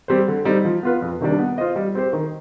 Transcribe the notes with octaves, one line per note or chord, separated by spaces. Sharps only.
G3 C4 G4 C5
D3
G3 C4 D#4
F3
B3 F4 B4
F2
C3 D#3 G3 D4
B3
F4 C5 D#5
G3
C4 G4 C5
D#3